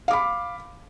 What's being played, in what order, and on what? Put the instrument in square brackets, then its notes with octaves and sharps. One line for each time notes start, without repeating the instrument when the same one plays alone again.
[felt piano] F5
D6
B5